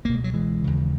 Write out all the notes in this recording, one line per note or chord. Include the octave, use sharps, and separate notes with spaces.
C#2 B2 A#3
G#3
F#3
E3 G#3
D#2 C#3